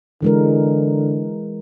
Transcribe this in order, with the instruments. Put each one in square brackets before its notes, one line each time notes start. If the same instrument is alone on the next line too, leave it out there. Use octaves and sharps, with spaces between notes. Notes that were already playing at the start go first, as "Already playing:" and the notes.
[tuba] D3 [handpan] E3 G#3 A#4